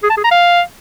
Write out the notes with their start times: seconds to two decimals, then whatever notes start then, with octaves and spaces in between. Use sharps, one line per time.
0.03 G#4
0.10 A5
0.17 G#4
0.24 A#5
0.31 F5